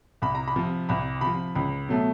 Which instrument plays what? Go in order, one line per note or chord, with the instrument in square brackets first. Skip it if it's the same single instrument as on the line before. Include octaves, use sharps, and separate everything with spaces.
[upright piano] C2 B5
A#5
B5
C3 F3
C2 B5
C3 F3 B5
C#2 B5
B2 F#3 A3